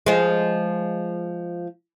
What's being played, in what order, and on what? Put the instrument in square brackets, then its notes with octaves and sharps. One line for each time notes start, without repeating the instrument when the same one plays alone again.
[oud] F3 G#3